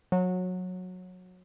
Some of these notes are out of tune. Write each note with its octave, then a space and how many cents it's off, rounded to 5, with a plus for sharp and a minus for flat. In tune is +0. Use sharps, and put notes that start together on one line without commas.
F#3 -20